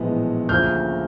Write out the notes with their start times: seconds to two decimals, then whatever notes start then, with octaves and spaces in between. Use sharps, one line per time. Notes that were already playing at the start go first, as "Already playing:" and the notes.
Already playing: A#1 A2 E3 G#3 B3
0.49 D2 C#3 F3 A#3 F6 G6